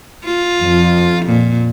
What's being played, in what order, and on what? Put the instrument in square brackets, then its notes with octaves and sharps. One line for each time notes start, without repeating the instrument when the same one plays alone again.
[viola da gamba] F4
[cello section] F2
[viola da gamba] A#2